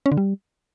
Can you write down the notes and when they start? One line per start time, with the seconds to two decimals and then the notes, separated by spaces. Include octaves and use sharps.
0.06 C#4
0.12 D3
0.17 G3